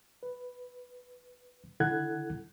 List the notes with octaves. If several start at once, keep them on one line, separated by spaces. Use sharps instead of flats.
B4
D3 E4 A4 F#5 F#6 G#6